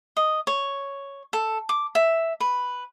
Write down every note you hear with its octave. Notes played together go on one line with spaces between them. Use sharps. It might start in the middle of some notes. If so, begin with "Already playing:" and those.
D#5
C#5
A4
D6
E5
B4